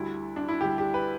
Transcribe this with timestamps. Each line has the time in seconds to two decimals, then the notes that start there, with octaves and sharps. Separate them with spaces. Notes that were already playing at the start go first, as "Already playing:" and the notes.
Already playing: D2 D3 G3 E4
0.36 D4
0.48 E4
0.60 D2 D3 G3 G4
0.78 G4
0.94 B4